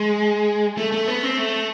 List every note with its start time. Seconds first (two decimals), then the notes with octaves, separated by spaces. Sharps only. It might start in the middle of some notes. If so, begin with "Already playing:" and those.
Already playing: G#3
0.77 A3
0.92 A3
1.08 B3
1.23 C4
1.37 A3